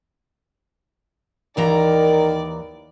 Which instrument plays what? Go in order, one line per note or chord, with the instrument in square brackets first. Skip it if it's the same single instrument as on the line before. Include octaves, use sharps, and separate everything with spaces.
[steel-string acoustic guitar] D#2 E3 A#5 [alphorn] D#3 [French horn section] A#4 [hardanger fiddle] D5